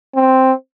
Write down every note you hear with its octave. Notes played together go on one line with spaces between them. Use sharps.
C4